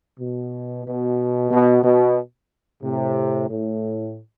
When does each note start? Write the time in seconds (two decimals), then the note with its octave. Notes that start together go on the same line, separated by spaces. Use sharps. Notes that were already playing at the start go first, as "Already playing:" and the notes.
0.18 B2
0.84 B2
1.49 B2
1.83 B2
2.81 A2 C3
3.48 A2